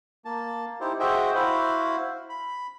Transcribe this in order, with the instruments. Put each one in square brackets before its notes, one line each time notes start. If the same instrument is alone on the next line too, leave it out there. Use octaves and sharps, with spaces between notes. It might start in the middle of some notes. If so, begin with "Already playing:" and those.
[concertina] A#3 A5
D#4 E4 G4 C5
F#4 G#4 C5 D#5 E5 G5
E4 F#4 C5 F5 B5
B5